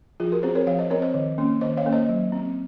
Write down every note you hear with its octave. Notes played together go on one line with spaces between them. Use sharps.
F3 F4 G#4
F#4 A#4
C4 G#4 C5
A#4 C#5
F3 C#5 F5
C5 D#5
C4 A#4 C#5
C5 D#5
D#3
A#3 C#4
D#3 C5 D#5
C#5 F5
A#3 C#4
C5 D#5
F#3
C4